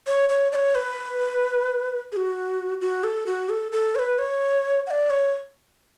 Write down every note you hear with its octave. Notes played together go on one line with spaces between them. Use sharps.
C#5
C#5
D5
C#5
B4
G#4
F#4
F#4
A4
F#4
A4
A4
C#5
B4
C#5
F#5
D5
C#5